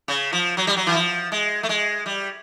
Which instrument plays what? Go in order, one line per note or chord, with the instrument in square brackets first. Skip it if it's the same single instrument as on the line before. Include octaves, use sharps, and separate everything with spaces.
[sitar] C#3
F3
F#3
G3
F#3
E3
F3
G#3
A3
G#3
G3